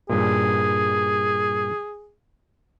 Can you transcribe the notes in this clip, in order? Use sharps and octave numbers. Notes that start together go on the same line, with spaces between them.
G2 A#2 G#4